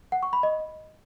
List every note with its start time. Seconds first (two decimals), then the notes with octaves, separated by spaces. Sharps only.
0.12 F#5
0.23 C#6
0.33 B5
0.43 D#5